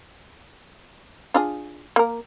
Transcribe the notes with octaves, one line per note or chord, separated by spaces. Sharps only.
D4 F4 G#4
A#3 A#4